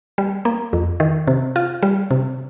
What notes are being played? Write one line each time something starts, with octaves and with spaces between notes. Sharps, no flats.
G3
A#3
F2
D#3
C3
F4
G3
C3